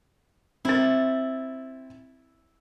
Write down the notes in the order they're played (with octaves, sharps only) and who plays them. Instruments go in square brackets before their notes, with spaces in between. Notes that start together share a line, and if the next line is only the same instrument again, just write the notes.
[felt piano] C4 A6 [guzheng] E4